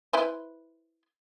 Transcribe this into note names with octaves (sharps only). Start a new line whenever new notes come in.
E4 B4 C5